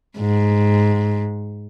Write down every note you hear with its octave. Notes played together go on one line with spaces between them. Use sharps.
G#2